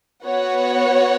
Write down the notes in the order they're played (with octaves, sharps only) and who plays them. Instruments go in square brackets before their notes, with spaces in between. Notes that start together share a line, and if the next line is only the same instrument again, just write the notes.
[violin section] B3 F#4 C#5 F#5